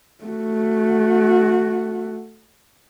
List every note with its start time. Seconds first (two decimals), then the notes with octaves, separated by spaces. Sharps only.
0.25 A3 F#4